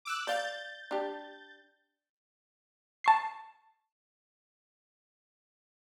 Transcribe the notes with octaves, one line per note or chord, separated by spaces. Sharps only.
D6 E6 F#6
D5 F5 G6 A6
D4 G4
A5 C#6 C7